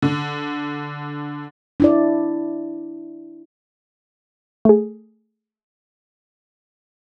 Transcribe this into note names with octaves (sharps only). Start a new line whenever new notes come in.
D3
D4 E4 D5
A3 G#4